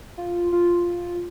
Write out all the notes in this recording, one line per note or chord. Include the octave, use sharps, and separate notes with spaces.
F4
F4